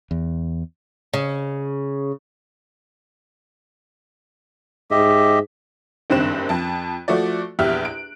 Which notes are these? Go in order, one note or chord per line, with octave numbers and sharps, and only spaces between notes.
E2
C#3
G#2 G4 D#5 E5
F#1 G2 D#3 C4 F#6 E7
F2 A5
F3 A3 F#4 D5
A#1 E2 G4 E5 F6 F#6
D7